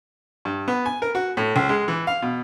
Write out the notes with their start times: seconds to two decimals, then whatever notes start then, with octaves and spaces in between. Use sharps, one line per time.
0.45 G2
0.68 B3
0.86 G#5
1.02 A#4
1.15 F#4
1.37 A2
1.56 C#2
1.69 G#3
1.88 E3
2.07 F5
2.22 B2